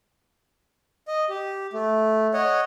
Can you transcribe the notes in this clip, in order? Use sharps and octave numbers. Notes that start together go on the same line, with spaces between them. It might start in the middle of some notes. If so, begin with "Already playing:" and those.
D#5
G4
A3
C#5 D#5 F#5